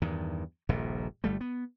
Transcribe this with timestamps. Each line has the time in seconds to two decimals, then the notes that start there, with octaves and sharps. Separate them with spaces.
0.02 E2 G2 D#3
0.69 D#1 A#1 G2 A#2
1.24 G1 G3 A3
1.41 B3